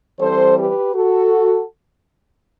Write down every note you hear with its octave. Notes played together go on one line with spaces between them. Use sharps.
E3 G3 C4 A4 C5
G4 B4
F#4 A4